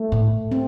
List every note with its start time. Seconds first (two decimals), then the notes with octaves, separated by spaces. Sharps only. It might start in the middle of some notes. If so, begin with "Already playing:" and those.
Already playing: A3
0.12 A2
0.52 C4